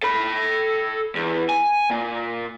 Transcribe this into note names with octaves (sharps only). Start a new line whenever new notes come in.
A4 B5
E2
G#5
A#2